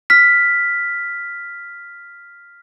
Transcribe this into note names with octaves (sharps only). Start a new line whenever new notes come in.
F6 B6